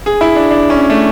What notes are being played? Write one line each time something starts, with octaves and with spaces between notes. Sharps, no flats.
G#4
E4
D4
D4
C#4
A3